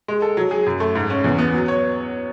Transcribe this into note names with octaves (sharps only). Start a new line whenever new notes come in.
G#3
A4
F#3
G#4
F#2
A3
G#2
C#4
E2
B3
F#3
C#5